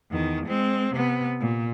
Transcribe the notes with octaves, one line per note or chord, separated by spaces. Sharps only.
E2 D#3
G#3 C4
C3 B3
A#2